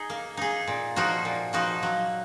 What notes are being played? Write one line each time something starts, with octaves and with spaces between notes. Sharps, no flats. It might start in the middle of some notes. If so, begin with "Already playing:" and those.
Already playing: D#4 G#4
A#3
D#4 G#4
A#2
F3 A#3 D#4 F#4
A#2
F3 A#3 D#4 F#4
F#3